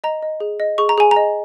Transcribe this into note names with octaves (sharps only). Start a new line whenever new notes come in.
D#5 A#5
D#5
G#4
D#5
G#4 C#6
A#5
G#4 G#5
A#5
D#5